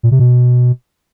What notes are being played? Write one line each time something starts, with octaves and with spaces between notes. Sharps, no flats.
A#2
C3
B2